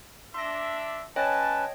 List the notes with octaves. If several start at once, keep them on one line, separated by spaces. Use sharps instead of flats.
D4 E5 C6 A#6
C#4 B4 C#5 D#5 G5 A5